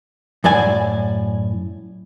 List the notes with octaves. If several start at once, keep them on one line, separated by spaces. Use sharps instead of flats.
F#2 A2 D5 G#5